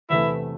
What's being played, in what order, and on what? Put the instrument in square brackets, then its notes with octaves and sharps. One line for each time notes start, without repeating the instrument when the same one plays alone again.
[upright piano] E2 C3 E3 A3 [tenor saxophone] E4